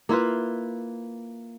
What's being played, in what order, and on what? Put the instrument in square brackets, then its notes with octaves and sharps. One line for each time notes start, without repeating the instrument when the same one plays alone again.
[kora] A#3 E4 F4 B4